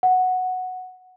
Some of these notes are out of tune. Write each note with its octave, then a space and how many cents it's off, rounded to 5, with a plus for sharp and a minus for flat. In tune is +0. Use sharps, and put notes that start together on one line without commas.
F#5 -5